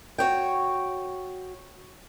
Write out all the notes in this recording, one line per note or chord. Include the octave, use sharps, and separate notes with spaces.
F#4 C#5 G5